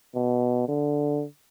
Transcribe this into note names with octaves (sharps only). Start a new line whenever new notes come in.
B2
D3